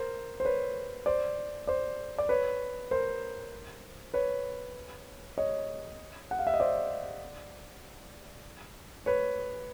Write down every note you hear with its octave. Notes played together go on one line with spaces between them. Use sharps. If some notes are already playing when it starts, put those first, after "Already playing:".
Already playing: A#4 C5
C5
B4 C#5
C5 D5
C5 D5
D5
B4 C#5
A#4 C5
B4 C#5
C#5 D#5
F#5
F5
E5
D#5
C5 D5
B4 C#5